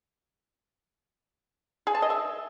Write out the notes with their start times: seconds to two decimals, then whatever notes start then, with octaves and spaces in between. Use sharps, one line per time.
1.87 G#4
1.95 A5
2.02 D#5
2.10 E5